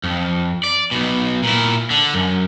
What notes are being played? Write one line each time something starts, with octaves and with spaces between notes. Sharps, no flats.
F2
D5
B1 B2
A#2 E4
D3
F#2